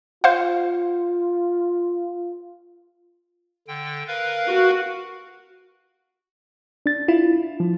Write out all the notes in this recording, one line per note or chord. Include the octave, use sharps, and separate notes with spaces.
F4 C5 F5 F#5
D3 G5
A#4 B4 F5
F#4
D4 A6
E4 F4
F3